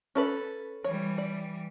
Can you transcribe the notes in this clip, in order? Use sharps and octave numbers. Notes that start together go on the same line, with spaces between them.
C#4 A4 B4
E3 G3 C#5
D5